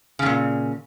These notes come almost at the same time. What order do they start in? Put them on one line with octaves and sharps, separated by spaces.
C#3 G2 A#2